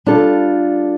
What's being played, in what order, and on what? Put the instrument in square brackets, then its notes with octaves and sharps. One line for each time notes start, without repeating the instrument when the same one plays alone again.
[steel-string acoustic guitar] G3 D4 F4 A4